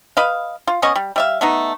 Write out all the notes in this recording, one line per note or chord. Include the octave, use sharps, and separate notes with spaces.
B4 D#5 F5
F4
B3 C#4 D#5 C#6
G3
G3 E5 F5
A3 B3 D#4